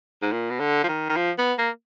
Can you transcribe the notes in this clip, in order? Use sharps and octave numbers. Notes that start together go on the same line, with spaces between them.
G#2
A#2
B2
D3
F3
D#3
D#3
F3
B3
A#3